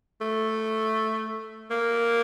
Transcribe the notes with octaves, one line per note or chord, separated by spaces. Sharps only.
A3
A#3